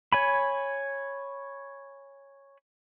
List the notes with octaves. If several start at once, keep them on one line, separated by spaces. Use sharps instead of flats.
C#5 G#5 B5